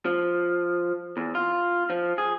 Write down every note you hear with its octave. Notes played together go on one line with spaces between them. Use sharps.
F3
E2
F4
F3
G#4